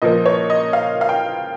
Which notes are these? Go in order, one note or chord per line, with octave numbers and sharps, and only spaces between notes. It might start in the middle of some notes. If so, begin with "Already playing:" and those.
A#2 F3 A#3 D#5
C#5
D#5
F5
F5
G5